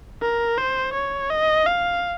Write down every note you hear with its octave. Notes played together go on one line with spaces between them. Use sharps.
A#4
C5
C#5
D#5
F5